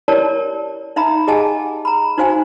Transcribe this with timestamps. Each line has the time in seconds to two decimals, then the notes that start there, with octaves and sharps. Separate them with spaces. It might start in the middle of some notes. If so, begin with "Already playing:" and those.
0.08 E4 G4 A#4 C#5 D5 A5
0.96 D#4 E5 F5 A#5 B5
1.27 G4 G#4 D#5 F#5 G#5 A5
1.85 A#5 B5
2.18 D#4 F#4 C5 F5 G#5